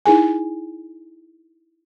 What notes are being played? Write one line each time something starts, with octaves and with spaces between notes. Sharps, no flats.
D#4 E4 G#4 G#5